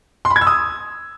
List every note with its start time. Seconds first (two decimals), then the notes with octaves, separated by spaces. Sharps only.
0.25 C6
0.30 B5
0.36 G#6
0.41 E6
0.47 D#6